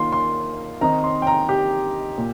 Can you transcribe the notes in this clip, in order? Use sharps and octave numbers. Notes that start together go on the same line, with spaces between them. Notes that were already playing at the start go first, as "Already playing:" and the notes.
Already playing: D#3 A#3 F4 C6
C6
D#3 C4 D#4 A#5
C6
G5
A#5
G4
A#2